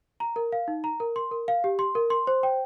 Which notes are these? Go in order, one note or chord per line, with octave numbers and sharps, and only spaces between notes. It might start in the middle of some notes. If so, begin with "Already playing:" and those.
A#5
A#4
F5
D#4
A#5
A#4
C6
A#4
F5
G4
C6
A#4
C6
C5
G5